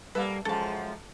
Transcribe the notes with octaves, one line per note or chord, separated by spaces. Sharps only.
G3 A#3 A4 B4 E5
F#2 F3 G#3 A4 A5